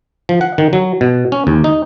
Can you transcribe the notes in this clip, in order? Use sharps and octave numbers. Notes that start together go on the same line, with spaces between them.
F3
F#5
D#3
F#3
B2
C#4
D#2
D#4